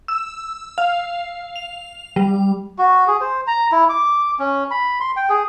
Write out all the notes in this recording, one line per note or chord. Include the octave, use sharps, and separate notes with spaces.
E6
F5
F7
G3
F#4
G#4
C5
A#5
E4
D6
C#4
B5
C6
G5
G#4